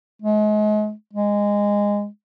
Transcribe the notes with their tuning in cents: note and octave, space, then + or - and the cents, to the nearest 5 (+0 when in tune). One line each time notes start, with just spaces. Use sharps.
G#3 +35
G#3 -15